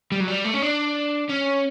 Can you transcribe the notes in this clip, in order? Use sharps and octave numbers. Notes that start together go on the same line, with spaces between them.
G3
F#3
G3
A3
C#4
D4
C#4